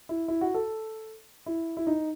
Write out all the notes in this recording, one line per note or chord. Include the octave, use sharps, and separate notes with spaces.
E4
E4
F#4
A4
E4
E4
D#4